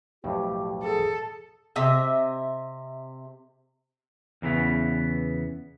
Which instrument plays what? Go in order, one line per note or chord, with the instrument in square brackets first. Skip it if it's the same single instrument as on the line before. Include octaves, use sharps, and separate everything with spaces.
[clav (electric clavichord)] B1 F2 A2 [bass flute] G4
[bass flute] G#4 [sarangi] A4
[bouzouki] C3 D#5 E5
[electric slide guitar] E2 C#3 E3 B3